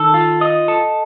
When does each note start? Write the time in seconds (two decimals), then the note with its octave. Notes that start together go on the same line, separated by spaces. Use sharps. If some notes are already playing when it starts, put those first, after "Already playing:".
Already playing: D#3 A4
0.14 F4
0.41 D#5
0.68 A4